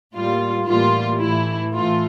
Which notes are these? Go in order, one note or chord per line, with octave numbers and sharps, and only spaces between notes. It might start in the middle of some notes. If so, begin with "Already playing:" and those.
A2 G3 A#3 F4
A2 E3 G3 A#3 F4
A2 E3 A3 E4
A2 E3 A3 F4